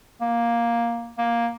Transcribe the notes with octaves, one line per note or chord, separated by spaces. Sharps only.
A#3
A#3